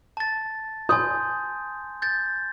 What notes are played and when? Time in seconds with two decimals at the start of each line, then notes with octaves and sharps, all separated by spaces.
0.17 A5 A6
0.89 G#5 C6 D#6 G6
2.02 G6 A6